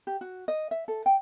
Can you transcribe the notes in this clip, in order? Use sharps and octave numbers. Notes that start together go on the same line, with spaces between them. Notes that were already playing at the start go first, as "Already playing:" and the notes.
G4
F#4
D#5
E5
A4
G5